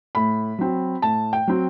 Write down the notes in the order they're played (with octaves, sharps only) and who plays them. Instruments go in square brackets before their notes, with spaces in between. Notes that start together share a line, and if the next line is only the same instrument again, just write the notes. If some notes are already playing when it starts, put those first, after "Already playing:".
[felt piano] A2 B5
F#3 C4
A2 A5
G5
F#3 C4